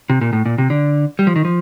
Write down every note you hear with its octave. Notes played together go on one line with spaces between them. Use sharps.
C3
A#2
A2
A#2
C3
D3
G3
F3
D#3
F3